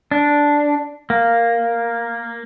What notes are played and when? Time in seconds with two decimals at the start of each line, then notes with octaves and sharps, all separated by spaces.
0.11 D4
1.10 A#3